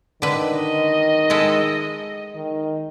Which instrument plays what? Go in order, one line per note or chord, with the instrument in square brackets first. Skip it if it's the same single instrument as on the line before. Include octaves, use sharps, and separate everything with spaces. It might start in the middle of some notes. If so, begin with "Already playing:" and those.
[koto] D3 B4 [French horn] D#3
[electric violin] D#5
[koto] G#3 E4 A4
[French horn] D#3